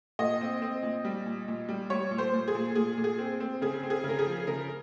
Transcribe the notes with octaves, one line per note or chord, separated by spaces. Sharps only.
A#2 D#5
C4
C4
A#2
G3
A#2
A#2
G3
G3 C#5
A#2
C5
A#2
G#4
A#2
A#2 G#4
A#2
G#4
C4
C4
C#3 G#4
C4
G#4
C#3
A#4
G#4
F3
C#3 A#4